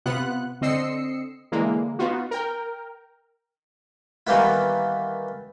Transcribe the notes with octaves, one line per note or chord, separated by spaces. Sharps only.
C3 B3 F4 F#5 F#6
D3 C4 D#5 E6 C7 C#7
D3 E3 G#3 A#3
B3 D#4 F4 F#4
A#4 G5
D#3 E3 G3 A#3 B3 E4